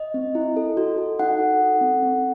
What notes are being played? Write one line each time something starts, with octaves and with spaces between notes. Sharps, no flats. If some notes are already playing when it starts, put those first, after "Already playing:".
Already playing: D#5
C4
E4
A4
F#4
A4
D#4 F#5
A4
A4
C4
C4